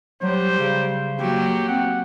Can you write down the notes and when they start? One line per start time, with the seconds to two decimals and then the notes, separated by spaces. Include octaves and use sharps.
0.23 F#3 G3 C5
0.60 C#3
1.20 F#3 A#3 G4
1.69 C4 F#5